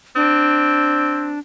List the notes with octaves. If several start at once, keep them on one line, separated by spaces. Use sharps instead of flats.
C4 D4